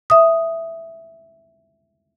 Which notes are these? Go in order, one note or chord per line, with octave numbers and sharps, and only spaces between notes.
E5 D#6